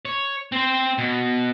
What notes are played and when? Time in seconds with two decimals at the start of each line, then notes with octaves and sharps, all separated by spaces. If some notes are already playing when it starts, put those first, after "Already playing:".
0.05 C#5
0.52 C4 C5
0.98 B2